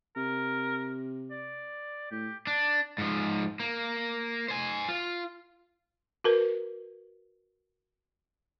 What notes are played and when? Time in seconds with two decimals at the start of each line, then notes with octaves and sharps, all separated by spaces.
0.16 C3 A#4
1.31 D5
2.11 A2 G4
2.47 D4
2.98 G#2 F3
3.60 A#3
4.48 C5 G#5
4.89 F4
6.24 F#4 A#4 B4